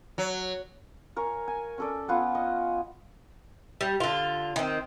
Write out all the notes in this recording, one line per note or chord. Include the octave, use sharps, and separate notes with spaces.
F#3
A#4 C#5 G#5
G#5
C#4 A4 D5
B3 F4 F#5 G#5
D#5
G3
D3 F4
D#3 C4